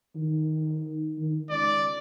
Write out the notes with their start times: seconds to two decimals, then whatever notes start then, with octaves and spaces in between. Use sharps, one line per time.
0.15 D#3
1.18 D#3
1.50 C#2 D5